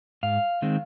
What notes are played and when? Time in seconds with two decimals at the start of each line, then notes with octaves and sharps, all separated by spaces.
0.23 G#2 F5
0.62 D#3 G#3 C4